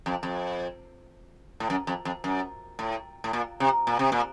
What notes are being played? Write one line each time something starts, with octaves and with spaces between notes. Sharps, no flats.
F2
F2
A2
F#2
F2
F2
F#2
A2
A2
A#2
C3
A#2
C3
A#2